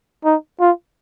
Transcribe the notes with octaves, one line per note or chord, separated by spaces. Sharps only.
D#4
F4